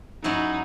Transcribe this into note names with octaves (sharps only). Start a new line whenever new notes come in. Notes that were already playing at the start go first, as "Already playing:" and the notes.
G#2 F#3 C#4 D#4 E4